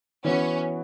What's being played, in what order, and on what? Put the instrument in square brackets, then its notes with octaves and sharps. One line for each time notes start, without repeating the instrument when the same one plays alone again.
[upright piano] E3 B3 F#4 C#5 [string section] C#4